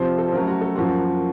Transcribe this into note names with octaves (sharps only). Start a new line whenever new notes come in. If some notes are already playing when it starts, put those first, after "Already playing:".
Already playing: C3 F3 C4 C5
A4
C5
C#3 F#3 A3 A#4
F#4
A4
F#2 F3 A#3 F#4